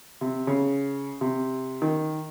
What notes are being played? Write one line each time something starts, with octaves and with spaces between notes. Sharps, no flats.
C3
C#3
C3
D#3